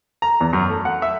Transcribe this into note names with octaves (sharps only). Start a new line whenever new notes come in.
A#5
E2
F#2
A3
F#5
E5